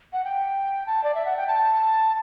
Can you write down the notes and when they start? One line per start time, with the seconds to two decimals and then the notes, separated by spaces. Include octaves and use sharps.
0.13 F#5
0.24 G5
0.86 A5
1.04 D5
1.15 E5
1.26 F#5
1.37 G5
1.48 A5